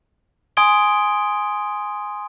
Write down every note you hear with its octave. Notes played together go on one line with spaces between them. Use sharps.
G#5 C6 D#6 G#6 D7 G7